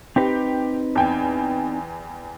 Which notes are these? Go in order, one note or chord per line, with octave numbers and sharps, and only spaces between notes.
C4 D#4 G4 B4
E2 G5 G#5